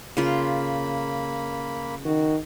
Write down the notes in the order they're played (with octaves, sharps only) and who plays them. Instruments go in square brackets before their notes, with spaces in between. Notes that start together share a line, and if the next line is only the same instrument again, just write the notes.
[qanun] C#3 F4 C6 [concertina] A#3 B5
[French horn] D#3 [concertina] F#4